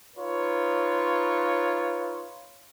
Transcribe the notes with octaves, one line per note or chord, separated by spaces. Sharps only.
D#4 F4 B4 C#5